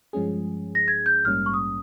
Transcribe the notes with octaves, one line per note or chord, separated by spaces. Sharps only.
G2 F3 G#3 C#4 G#4
A#6
G#6
G6
A#1 G#2 G3 A#3 C#4 F6
C#6
D#6